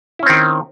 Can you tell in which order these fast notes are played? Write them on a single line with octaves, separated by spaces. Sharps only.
E4 C#4 C4 D#3